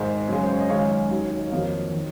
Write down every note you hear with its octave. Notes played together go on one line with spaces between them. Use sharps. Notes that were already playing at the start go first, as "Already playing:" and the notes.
Already playing: G#1 G#2 D#3 G#3 C5 D#5
F#2 C#3 G#3
C5
C#5
D#5
G#1 F#2 C#3 G#3 C#5 F5
D#2 D#3 F#3
D#5
F2 D#3 F#3 A#3 C#5 F5
D#3